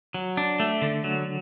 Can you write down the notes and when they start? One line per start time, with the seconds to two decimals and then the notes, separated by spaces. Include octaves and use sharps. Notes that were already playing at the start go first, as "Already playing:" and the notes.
0.14 F#3
0.37 D4
0.60 A3
0.82 D3
1.04 F#3